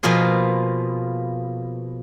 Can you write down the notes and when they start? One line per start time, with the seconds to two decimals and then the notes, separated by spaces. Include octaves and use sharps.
0.03 B2 F3 A#3 F4 G#4 C5